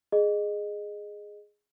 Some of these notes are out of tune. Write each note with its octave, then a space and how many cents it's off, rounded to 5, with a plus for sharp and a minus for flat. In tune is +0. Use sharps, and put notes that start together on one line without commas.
G#4 +0 D#5 -20